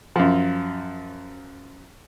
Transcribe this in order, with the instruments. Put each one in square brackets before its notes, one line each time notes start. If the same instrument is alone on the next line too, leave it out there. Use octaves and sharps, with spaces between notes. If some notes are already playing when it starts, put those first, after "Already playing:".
[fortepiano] F#2 F3